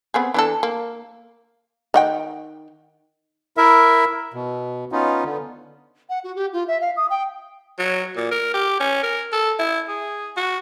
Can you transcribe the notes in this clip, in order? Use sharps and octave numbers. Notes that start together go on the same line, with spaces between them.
B3 C4 G#4
E3 D4 A4
A#3
D#3 F#5 G5
E4 A#4 E5
B2
B3 C#4 D#4 F4
D3 B3
F#5
F#4
G4
F4
E5
F5
D#6
G5
F#3
A#2
A#4
G4
C#4
A#4
A4
E4
G#4
F#4